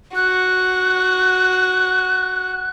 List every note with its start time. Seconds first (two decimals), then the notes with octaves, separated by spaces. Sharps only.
0.15 F#4 F#6